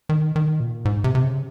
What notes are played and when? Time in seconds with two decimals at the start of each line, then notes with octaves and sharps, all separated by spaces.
0.09 D#3
0.36 D#3
0.60 A#2
0.85 G#2
1.04 C3
1.15 C3
1.23 C#3